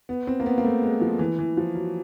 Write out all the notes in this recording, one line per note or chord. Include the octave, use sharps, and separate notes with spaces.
B3
C4
A#3
B3
A#3
A3
G#3
F3
E3
E3
F3
F#3